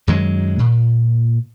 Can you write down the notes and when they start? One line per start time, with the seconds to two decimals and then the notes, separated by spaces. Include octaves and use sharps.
0.07 F#2 D#3 F#3 G#3
0.59 A#2